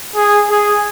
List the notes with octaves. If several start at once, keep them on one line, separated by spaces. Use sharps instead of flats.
G#4
G#4